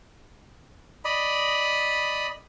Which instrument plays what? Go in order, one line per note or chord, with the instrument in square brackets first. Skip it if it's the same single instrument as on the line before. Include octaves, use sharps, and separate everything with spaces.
[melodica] D5 D#5 B5